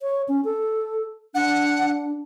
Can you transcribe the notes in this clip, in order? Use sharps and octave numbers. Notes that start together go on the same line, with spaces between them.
C#5
C#4
A4
D4 F#5